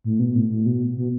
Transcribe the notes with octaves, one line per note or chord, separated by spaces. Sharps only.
A2
B2
A2
A2
B2
B2